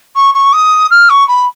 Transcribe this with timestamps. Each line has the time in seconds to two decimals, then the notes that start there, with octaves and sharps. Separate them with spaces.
0.16 C#6
0.34 C#6
0.53 D#6
0.91 F6
1.10 C#6
1.28 B5